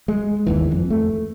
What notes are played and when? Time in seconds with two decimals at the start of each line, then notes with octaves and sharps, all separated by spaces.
0.08 G#3
0.46 G1 D#2 E3
0.72 F2
0.90 A3